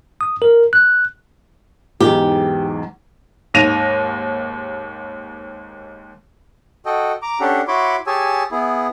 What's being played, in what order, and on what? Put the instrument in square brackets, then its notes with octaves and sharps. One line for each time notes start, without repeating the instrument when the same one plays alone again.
[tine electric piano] D#6
A#4
F#6
[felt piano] B1 E2 G#2 [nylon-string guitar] G4
[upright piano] D#2 G#2 A#6 D#7 F7
[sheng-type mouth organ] F#4 A4 D#5 G5
A#5 D6
C#4 D4 G4 A4 F#5
E4 F#4 C#5 B5 C6 D6
G4 G#4 C#5 G#5 A5 E6
B3 E4 G#4